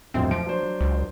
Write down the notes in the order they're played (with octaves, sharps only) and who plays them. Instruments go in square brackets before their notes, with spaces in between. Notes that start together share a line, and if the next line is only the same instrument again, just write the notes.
[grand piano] D1 F2 [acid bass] C4
[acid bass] F3 [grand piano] D7
[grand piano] F#3 D4 C5
[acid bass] C#2